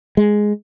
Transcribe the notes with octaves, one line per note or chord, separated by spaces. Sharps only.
G#3